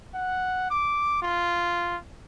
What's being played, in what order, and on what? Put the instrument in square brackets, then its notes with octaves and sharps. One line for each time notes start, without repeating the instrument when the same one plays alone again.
[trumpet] F#5
D6
F4